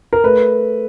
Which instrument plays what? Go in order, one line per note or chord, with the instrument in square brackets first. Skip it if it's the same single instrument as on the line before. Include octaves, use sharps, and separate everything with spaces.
[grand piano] A#4
A3 B4